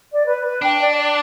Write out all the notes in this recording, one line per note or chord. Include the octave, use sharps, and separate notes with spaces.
D5
B4
B4
D4 G5
D5
D5